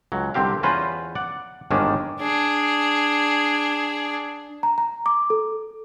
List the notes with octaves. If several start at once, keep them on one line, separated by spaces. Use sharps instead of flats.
C#2 F#3
C2 D3 C4 G4 F5
E2 C#4 F4 B4 C5 A#5
D5 F#5
G1 G#2 D#3 A#3 C#4 D4
D4 G#4
A#5
A#5
D6
A4